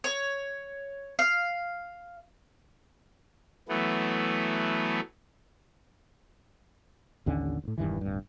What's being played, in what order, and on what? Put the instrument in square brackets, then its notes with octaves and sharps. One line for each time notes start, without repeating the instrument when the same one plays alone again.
[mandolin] C#5
F5
[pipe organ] E3 F#3 A3 B3
[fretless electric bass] A1 D#2 D3 C#4
A1 A2
E1 G2 D#3 E3
D1 G2